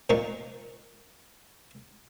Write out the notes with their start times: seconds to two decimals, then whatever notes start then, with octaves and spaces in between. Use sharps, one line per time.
0.10 A#2 F3 A#3 D#4 C#6